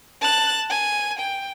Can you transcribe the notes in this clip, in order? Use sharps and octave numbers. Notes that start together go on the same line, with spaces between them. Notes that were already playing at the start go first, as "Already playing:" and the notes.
A5 F#6
G#5
G5